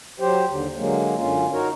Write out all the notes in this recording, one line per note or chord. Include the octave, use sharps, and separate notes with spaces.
F#3 G4 C5
D#2 D3
D3 F#3 G#3 A#3
F#2 D3 C#4 F4
D#4 F#4 A#4 C#5